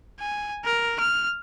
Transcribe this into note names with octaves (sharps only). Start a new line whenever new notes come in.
G#5
A#4
F6